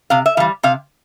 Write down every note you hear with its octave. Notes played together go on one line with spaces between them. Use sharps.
C3 F5
E5
E3 G3 F5
C3 F5